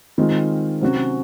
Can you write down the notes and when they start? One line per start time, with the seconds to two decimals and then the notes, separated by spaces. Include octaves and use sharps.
0.18 D#3 G#3 C4 F4
0.81 C3 F#3 C#4 F#4